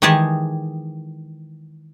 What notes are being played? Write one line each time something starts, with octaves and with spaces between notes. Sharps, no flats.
D#3 E3 G#3 G4 G#4 A5